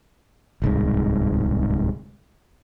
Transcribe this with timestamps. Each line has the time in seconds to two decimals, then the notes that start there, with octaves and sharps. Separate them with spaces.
0.62 D1 C2 G#2